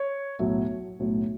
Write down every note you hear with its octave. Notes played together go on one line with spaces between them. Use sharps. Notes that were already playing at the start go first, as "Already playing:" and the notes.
Already playing: C#5
B1 A2 F#3
B1 A2 F#3